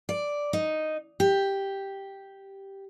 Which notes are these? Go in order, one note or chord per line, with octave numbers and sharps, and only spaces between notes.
D5
D#4
G4